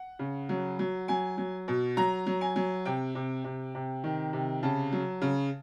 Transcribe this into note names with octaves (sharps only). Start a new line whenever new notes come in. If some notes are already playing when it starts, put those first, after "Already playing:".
Already playing: F#5
C#3
F#3
F#3
F#3 G#5
F#3
B2
F#3 A#5
F#3
G#5
F#3
C3 G5
C3
C3
C3
D#3
C3
C#3 A5
F#3
C#3